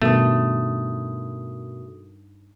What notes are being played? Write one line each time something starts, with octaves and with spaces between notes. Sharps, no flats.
G2 B2 D#3 A3 F#4 A#4 D#6